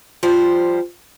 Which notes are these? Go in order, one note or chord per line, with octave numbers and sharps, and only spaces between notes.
F3 G3 C5